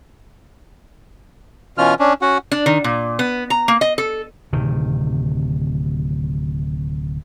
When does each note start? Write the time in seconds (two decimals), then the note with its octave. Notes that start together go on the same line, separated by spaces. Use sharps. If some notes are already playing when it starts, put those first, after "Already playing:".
1.78 B2 E3 C#4 F4 F6
1.99 C#4 D4
2.22 C#4 F#4 F#5
2.52 D4
2.66 D#3
2.84 A#2
3.19 B3
3.50 A#5
3.68 A#3
3.81 D#5
3.98 A4
4.52 D1 C3 D#3